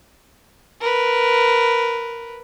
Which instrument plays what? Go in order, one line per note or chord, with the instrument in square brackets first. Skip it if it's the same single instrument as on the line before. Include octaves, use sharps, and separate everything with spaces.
[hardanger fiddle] A#4 B4